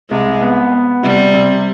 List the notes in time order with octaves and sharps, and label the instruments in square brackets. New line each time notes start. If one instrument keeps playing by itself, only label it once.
[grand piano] C2 [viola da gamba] G#3
[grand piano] B3
B3
[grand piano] C3 [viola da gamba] G3
[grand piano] C3